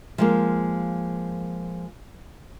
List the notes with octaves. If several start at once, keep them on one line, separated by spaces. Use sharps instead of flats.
F3 G#3 A#3